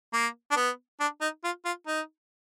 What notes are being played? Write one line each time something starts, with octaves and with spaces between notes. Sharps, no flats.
A#3
D4
B3
D4
D#4
F4
F4
D#4